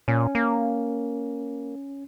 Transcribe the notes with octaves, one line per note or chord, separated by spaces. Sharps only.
A#2 C#4
A#3